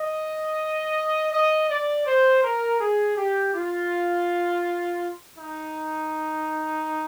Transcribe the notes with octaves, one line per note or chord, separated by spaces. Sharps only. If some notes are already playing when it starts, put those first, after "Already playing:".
Already playing: D#5
D#5
D5
C5
A#4
G#4
G4
F4
D#4